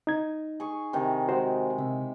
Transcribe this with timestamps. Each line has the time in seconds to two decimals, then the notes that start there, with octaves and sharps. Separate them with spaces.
0.07 D#4 G#6
0.60 G#4 C#6
0.93 C3 D#3 E4
1.29 G#3 F#4 C5
1.78 C3 E5